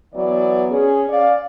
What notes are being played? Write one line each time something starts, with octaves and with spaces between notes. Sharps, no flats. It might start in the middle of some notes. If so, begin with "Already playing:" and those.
E3 F#3 B3 D5
C#4 G#4
C#4 D5 F5